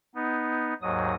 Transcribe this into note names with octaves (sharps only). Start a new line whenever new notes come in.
B3 D#4
D#2 G#2 F#3 D#6